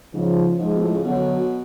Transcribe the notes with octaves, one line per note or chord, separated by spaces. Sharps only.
G#2 C#3 F3
G#2 F3 G#3
B2
A2
C#3
B2 D3 F#3